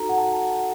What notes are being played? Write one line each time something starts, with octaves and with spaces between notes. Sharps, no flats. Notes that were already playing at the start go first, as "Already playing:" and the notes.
Already playing: D#4 F#4 A4 A#5
F#5
A5